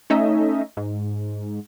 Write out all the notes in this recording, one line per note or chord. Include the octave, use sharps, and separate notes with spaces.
A3 C#4 D#4 D#5 E5
G#2